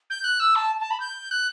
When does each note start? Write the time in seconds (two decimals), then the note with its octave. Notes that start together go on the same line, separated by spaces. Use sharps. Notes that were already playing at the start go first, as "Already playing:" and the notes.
0.10 G6
0.24 F#6
0.40 E6
0.56 A5
0.80 A5
0.91 B5
1.00 G6
1.31 F#6